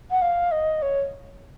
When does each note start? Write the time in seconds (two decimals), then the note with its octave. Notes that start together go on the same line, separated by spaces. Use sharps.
0.11 F#5
0.22 F5
0.52 D#5
0.82 C#5